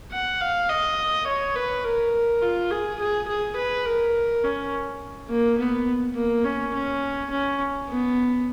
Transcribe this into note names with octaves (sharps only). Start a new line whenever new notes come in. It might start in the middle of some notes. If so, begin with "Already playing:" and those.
F#5
F5
D#5
C#5
B4
A#4
F4
G#4
G#4
G#4
B4
A#4
C#4
A#3
B3
A#3
C#4
C#4
C#4
B3